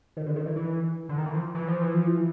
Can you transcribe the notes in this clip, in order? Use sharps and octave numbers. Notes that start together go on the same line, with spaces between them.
D#3
D3
D#3
E3
E3
D3
D#3
E3
F3
E3
F3
E3
F3
E3